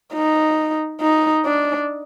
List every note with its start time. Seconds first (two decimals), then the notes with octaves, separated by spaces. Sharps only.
0.13 D#4
1.01 D#4
1.45 D4